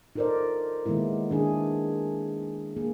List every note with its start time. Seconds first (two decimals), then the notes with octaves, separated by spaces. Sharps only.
0.15 D#4 F4 A4 A#4 C5 D5
0.86 D#3 G#3 A#3 B3 E4
1.30 D#3 D4 G#4
2.76 A#3 G#4